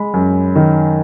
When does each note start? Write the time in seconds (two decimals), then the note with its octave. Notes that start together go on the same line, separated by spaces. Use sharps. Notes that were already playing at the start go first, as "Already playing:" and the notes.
Already playing: G#3 B5
0.14 F#2
0.56 D#3